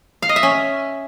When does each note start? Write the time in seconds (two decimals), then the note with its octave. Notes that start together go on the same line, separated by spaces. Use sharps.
0.22 F5
0.29 D#5
0.36 E5
0.43 C#4